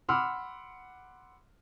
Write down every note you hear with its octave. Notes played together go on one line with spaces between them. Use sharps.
F#5 B5 C6 D6 E6 F6